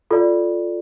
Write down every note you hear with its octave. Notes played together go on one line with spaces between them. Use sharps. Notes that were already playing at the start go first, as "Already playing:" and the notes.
F4 A4 D5